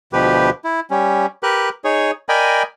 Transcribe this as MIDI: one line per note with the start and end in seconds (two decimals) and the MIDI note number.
0.13 0.50 38
0.13 0.50 47
0.13 0.50 53
0.13 0.50 67
0.13 0.50 71
0.64 0.80 64
0.91 1.26 55
0.91 1.26 61
1.43 1.69 67
1.43 1.69 70
1.43 1.69 71
1.43 1.69 90
1.84 2.11 63
1.84 2.11 68
1.84 2.11 73
2.29 2.63 70
2.29 2.63 74
2.29 2.63 75
2.29 2.63 79
2.29 2.63 80
2.29 2.63 83